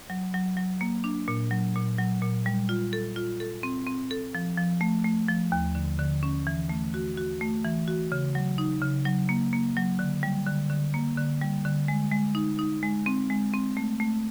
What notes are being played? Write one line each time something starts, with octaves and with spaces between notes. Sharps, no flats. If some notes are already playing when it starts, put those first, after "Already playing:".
F#3
F#3
F#3
A#3
D4
A#2
F#3
A#2
F#3
A#2
G3
F4
A4
F4
A4
C4
C4
A4
F3
F3
A3
A3
F3
D#2
D3
D3
C#4
E3
A3
F#4
F#4
A3
E3
F#4
C#3
F#3
D#4
C#3
F#3
A#3
A#3
F#3
D3
G3
D3
D3
A#3
D3
G3
D3
G#3
G#3
D#4
D#4
G#3
C4
G#3
C4
A3
A3